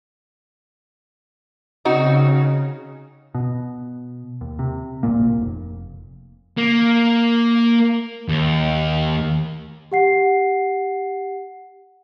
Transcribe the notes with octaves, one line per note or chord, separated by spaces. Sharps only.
C#3 C4 D#4 F#4
B2
D#2
C3
D1 A#1 A#2 A#3
F1
A#3
D#2
G4 F#5 C7